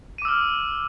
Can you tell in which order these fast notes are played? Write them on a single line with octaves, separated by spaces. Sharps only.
D#7 D6 E6 F6